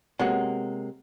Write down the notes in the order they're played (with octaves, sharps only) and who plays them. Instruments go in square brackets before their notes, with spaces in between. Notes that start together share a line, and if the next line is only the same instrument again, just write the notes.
[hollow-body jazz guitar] C3 G#3 A#3 [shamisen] F#3 B3 F#5